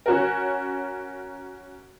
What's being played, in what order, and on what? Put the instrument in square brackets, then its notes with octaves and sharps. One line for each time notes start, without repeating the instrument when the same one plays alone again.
[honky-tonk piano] C#4 F#4 A#4